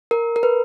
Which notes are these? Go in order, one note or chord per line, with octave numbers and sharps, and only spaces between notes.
A#4
A#4
B4